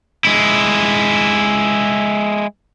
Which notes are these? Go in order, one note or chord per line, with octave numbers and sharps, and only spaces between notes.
G#3 E4